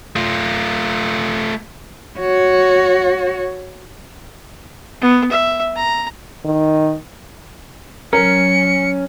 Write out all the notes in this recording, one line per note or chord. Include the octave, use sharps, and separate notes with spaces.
A3 F4
F#4 C#5
B3
E5
A#5
D#3
F#3 C#4 A#4 C#7